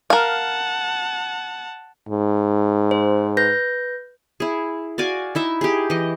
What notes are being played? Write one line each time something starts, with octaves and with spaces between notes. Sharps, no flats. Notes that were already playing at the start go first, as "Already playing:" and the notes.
A#4 F5 F#5 A5
G#2
C5
B4 G6 A#6
E4 G#4
F#4 D5 F5 G#5
D#4 E4 E5
G4 G#4
E3 D#5